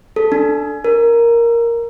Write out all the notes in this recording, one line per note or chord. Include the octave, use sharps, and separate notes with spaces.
A4
D4
A#4